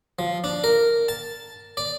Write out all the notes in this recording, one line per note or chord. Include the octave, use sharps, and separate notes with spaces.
F3
D4
A#4
A5
D5